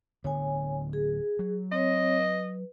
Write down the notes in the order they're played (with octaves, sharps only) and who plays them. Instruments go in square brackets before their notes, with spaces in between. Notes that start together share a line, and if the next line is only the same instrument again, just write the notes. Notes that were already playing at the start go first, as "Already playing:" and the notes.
[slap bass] D1 D3 B3 [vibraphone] C#5 G#5
[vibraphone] G#4
[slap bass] F#3
[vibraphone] C4 C#5 [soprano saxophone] D#5
[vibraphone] B4